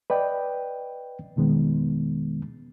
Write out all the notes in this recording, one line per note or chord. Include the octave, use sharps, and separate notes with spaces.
B4 D5 D#5 G5
F2 B2 D#3 G#3 B3